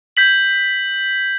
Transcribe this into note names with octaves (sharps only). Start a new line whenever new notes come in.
G6 B6 F#7